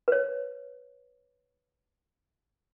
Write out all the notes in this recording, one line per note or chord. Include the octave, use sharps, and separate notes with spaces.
B4 C#5